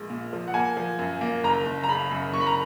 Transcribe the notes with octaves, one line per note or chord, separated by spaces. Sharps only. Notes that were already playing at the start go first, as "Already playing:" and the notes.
Already playing: A#1 G#3 A#3
A#2
F3
F#5
A#3 G#5
F3
F#2
A#3
F#1 A#5
F#1
A#5
C#3 B5
F#2
F#1 C#6
B5
A#5